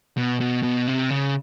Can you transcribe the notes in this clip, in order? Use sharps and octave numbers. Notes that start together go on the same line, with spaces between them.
B2
B2
B2
C3
C#3